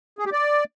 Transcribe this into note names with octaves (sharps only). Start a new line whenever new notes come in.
G#4
G4
D5